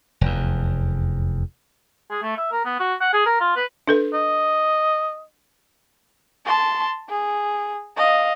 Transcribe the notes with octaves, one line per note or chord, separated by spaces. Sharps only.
F1 E2
G#4
A3
E5
A#4
B3
F#4
F#5
G#4
A#4
F4
B4
D4 A4 B4
D#5
A5 C6
G#4
D#5 F5